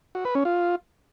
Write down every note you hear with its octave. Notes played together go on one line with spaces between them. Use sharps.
F#4
B4
C#4
F4